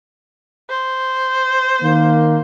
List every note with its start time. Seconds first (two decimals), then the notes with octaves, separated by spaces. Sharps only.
0.70 C5
1.81 D#3 A#3